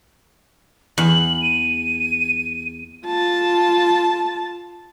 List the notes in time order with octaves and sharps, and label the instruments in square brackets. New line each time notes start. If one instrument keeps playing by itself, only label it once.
[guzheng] E2 [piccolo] F#7
[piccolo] D#7
[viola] F4 A5